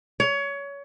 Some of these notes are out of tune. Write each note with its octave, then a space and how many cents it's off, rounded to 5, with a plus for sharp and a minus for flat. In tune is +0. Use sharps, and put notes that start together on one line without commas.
C#5 +25